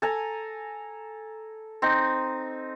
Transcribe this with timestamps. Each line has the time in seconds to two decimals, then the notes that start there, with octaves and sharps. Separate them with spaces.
0.02 A4 G#5 A#5
1.82 C4 D#4